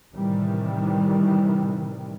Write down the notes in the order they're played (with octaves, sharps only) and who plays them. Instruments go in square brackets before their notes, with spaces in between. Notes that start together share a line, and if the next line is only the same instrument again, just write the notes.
[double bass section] A2 C3 D#3 E3 G3